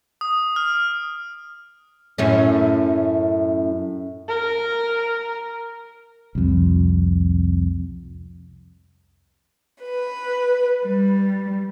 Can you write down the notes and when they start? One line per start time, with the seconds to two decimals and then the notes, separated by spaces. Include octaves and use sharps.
0.21 D#6
0.56 F6
2.18 F#2 A2 C#4
4.29 A#4
6.35 C2 F2
9.82 B4
10.86 G3